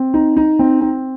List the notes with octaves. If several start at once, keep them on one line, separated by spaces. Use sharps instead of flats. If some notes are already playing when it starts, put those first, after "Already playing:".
Already playing: C4
D#4
D#4
C4
C4